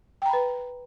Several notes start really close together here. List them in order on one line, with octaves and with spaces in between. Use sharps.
G5 A#5 B5 B4